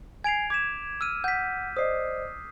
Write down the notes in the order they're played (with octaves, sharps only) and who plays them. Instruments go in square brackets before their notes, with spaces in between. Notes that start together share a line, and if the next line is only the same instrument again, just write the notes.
[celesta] G#5 C7 [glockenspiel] G#6 D7 F7
[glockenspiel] D6 B6 E7 [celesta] G#6
[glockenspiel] E6 F6 D#7
[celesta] F#5 [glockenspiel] G6 B6
[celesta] C5 D5 D#5 [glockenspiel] D#6 C7